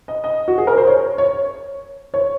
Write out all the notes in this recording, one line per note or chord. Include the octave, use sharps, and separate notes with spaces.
D#5
D#5
F#4
G#4
A#4
C5
C#5
C#5
C#5